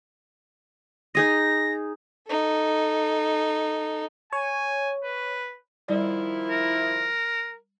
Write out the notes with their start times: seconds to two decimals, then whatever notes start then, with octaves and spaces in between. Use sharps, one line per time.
1.15 D#4 G#4 D#5 A#6
2.28 D#4 A4
4.33 C#5 G#5
5.04 B4
5.89 D#3 F3 G3 E4 D5
6.50 A#4